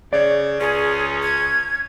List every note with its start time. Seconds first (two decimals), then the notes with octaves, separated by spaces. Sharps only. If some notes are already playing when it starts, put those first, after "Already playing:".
0.13 C#3 C#5 D5
0.60 C#2 C#4 G#4
1.22 G#6